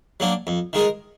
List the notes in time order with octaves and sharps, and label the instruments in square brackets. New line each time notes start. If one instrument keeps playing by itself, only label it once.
[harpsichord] F#3 A#3 D4
F2
D#3 G#3 D#4 A#4